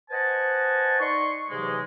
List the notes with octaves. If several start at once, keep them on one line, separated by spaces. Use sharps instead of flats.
B4 C5 D#5 F#5 G#5 A5
D#4 D5 C6 C#6
G#2 C3 E3 F#3 G#3